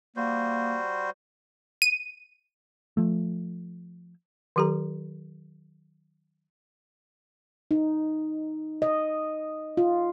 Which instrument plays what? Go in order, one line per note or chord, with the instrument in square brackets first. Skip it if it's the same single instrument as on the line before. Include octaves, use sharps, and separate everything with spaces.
[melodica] G3 F#4 C5 [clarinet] A#3
[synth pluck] D#7
[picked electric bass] F3 A3
[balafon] D#3 F#3 G4 A4 A#5
[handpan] D#4
D#5
F4